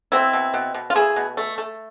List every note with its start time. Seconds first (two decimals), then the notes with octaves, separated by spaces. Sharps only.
0.12 B2 C4 E4
0.33 B2
0.54 B2
0.74 B2
0.90 F4
0.95 A3 E4 G#4
1.16 B2
1.37 A3
1.58 A3